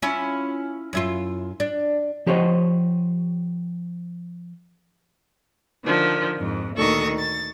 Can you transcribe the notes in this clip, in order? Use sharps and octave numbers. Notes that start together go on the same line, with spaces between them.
C#4 E4 F4
F#2 E4 F4
D4
F3 G4 C5 C#5 D#5
D3 D#3 F3
F2 G#2
D2 A#2 D#3 A4 C#6 D#6
A6